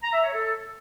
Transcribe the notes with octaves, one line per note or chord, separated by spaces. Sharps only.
A#5
E5
C#5
A4